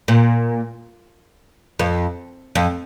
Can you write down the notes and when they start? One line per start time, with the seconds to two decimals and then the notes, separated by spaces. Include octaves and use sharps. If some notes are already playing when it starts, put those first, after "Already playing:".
0.08 A#2
1.79 F2
2.55 F2